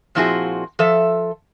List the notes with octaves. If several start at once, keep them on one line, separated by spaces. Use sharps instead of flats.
A#2 F3 C4 E4 F#4 G#4
F3 A4 E5